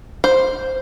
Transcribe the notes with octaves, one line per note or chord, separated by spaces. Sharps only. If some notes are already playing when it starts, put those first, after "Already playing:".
C5